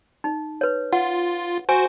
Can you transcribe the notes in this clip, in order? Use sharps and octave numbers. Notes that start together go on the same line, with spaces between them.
D#4
B4 C#5
F4 F#5
F#4 C5 G#5